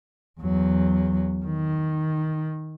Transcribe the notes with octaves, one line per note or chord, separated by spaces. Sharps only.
E2 F#3
D#3